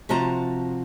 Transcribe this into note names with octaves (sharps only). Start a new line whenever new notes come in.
C3 F3 F#4 A5 A#5